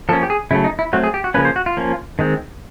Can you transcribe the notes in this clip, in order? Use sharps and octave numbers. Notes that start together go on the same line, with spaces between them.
F3 A#3 C#4 A4
G4
G#4
C#3 F#3 A3 E4
D#4
E4
F#3 A3 C4 F#4
G#4
G4
F#4
C#3 F3 A#3 C#4 B4
C5
F#4
F4
F3 A#3 C#4
D#3 G#3 C4